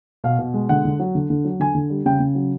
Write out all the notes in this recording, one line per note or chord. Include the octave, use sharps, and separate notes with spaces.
B2 F5
B2
G#3
D3 F#5
D3
F#3
D3
D3
F#3
D3 G#5
D3
G3
C#3 G5
C#3
F#3